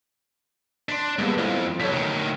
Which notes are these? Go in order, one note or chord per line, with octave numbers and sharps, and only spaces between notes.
D4 C6 B6
G2 G#3 A#3 B3
F2 E4
B1 C#5 A5 B6
D2 D#3